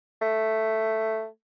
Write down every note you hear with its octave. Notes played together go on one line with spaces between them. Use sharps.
A3